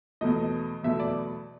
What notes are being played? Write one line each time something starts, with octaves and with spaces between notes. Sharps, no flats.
E2 B2 F#3 A3 D#5
E2 B2 F#3 A3 E5
D5